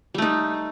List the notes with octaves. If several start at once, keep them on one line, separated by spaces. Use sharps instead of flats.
G3 A3 D#4